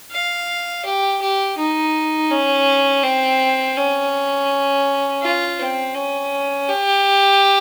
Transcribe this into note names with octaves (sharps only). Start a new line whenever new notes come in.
F5
G4
G4
D#4
C#4
C4
C#4
F4
C4
C#4
G4